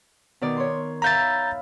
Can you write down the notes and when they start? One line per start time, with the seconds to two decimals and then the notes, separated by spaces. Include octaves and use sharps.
0.41 B2 D#3 D5
0.56 C#5 C6
1.02 E5 F5 A#5 B5 G6 A6